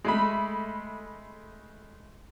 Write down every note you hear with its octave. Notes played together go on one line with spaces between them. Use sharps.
G#3 A3 B5